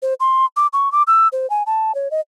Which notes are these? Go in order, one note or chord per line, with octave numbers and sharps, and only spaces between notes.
C5
C6
D6
C#6
D6
E6
C5
G#5
A5
C#5
D#5